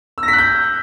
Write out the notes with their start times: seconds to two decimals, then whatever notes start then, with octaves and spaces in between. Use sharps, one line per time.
0.18 E6
0.23 A#6
0.28 B6
0.33 F#6
0.38 G6